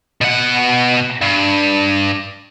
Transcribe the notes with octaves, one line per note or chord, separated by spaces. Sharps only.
B2 F#5
G2